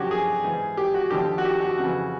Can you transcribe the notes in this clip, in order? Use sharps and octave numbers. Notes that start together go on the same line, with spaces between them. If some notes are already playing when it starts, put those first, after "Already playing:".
Already playing: F#2 D3 F3 F#4 G4 C#5
G#4
G#2 E3
G4
F#4
D#2 D3 F3 G4
F#4
G4
F#4
F2 C#3 E3 F#4